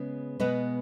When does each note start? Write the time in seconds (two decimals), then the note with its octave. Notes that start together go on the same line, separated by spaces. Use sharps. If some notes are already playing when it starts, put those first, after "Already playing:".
Already playing: C#3 G#3 B3 G#4 B4
0.39 B2 G#3 B3 B4 D#5